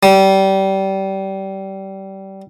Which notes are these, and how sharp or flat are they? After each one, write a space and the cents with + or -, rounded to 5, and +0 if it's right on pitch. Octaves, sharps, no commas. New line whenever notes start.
G3 -25